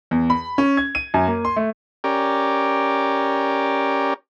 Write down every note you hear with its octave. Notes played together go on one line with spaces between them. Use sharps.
E2
B5
C#4
G#6
D#7
F#2
A#3
C6
A3
C#4 G4 A#4 D5